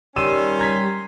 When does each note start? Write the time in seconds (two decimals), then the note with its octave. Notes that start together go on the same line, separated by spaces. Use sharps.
0.16 D#3 G3 C#4 C6 E6 D#7 E7
0.59 A#5 G#6 B6